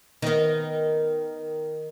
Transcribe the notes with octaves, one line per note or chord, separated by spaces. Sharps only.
D#3 B3